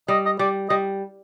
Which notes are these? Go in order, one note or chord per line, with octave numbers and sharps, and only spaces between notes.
G3 D#5
D#5
G3 D5
G3 D#5